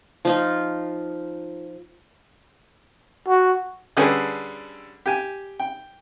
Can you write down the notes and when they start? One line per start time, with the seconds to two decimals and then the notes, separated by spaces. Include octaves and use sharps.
0.25 F3 D#4 F4
3.28 F#4
3.97 D3 G3 C#4 G#4 A4 B4
5.06 G4 G#5
5.59 G5